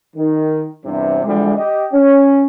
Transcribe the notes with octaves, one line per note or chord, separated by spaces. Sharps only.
D#3
E2 G2 C3
B2 D3 E3 F3 G3 G#3
G4 D#5
C#4